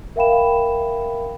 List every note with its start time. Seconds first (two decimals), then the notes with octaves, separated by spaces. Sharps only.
0.16 A#4 E5 F5 G5 B5 E7